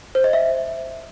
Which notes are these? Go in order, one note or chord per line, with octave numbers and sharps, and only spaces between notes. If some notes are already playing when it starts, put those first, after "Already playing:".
C5
D#5
E5